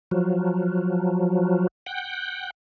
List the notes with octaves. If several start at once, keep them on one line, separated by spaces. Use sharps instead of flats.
F3 F#3
F#5 G5